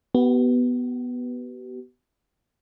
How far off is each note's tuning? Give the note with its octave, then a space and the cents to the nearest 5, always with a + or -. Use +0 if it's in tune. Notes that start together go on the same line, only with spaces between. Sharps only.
B3 +0 G4 -45